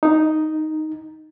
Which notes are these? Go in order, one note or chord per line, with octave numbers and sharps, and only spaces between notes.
D#4